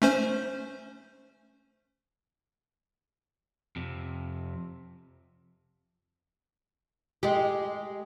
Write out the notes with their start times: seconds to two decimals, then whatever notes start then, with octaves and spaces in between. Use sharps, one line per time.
0.02 A3 C#4 C5
3.76 F2 C3
7.23 G#3 G4